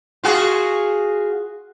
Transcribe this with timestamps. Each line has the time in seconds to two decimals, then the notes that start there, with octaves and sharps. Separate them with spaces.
0.24 F4 F#4 G#4